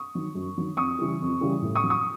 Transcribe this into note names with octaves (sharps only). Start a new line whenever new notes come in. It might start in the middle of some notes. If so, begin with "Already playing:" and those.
Already playing: C#6 D#6
D#3 F#3
F#2
D#3 F#3
F2 C#6 D#6
C#3 E3 G3
F2
C#3 E3 G3
A2
C#6 D#6
F#3
C#6 D#6